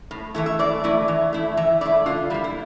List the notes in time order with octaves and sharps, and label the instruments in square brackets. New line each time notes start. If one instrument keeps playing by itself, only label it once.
[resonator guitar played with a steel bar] A2
E3 A3 E4
E5
A2 D5
E3 A3 E4
E3
A3 E4
E3 E5
A3 E4 D5
D3 F4
G3 A#3 E4
E4